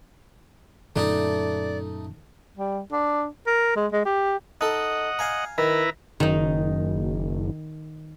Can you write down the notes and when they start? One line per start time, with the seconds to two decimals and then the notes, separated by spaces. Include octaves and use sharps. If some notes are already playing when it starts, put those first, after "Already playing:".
0.96 F#2 A#2 D3 A3 D#4 D5
2.57 G3
2.92 D4
3.47 A#4
3.76 G#3
3.92 G#3
4.05 G4
4.61 D#4 A4 D#5 F#5
5.19 F5 G#5 A#5
5.58 D#3 E4 B4 A#5
6.20 F#1 D#3 D#4